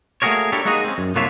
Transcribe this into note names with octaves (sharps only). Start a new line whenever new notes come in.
A3 A#3 F#4 G#4 A#4 C#5
D4 E4 G4 A4 A#4 C#5
G#3 A#3 D#4 F#4 G#4 D#5
C4 C#4
F#2
C2 D3 A#3 F4 C#5 E5